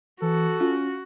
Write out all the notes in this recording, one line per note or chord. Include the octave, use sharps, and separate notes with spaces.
E3 F#4 A4
C#4 F4